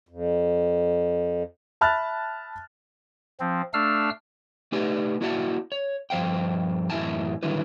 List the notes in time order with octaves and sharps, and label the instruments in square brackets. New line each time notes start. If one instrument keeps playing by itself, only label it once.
[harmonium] F2
[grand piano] E5 A5 B5 F6 F#6 A6
[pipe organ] F3 C4
A3 D4 F5 E6 F6
[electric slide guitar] A3 D#4 G4 B4 D5 G#5
A#3 E4 F#4 D5 F#5 A5
C#5
G2 F3 C5 F5 G5
F#2 A2 E3 E5 G#5 A5
D3 D#3 F#3 G3 E4 B4